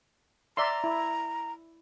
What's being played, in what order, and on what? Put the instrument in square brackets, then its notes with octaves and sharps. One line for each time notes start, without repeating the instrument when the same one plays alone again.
[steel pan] D5 E5 C6 [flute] A#5
[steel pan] E4